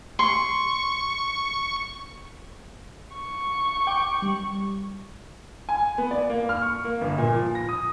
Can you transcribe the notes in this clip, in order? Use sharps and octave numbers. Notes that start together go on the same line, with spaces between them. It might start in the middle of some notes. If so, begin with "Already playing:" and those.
C6 C#6
C#6
G5 D6
G3
G#5
B3
D5
A#3
F6
C#6
A#3
G1
A#2
F3
A#6
D#6